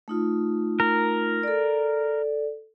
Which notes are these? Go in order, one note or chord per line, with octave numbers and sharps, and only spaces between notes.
A3 D#4 F4
A#4
A4 D5